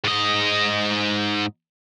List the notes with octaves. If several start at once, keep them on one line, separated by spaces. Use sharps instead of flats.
G#2 D#5